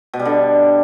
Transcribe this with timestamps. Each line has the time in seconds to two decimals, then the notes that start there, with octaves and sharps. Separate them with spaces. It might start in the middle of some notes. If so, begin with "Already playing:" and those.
0.14 B2
0.19 G3
0.25 D3